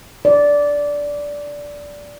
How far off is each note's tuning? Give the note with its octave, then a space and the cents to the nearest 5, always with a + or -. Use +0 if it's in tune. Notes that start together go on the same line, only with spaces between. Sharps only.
D5 -10